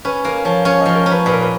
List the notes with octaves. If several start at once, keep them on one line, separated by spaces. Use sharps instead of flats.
C#4 B4
A#3 B4
F3 C#5
C#4 C#5
F3 D#5
A#4
C#4
B4
A#2 B4
A#4
B4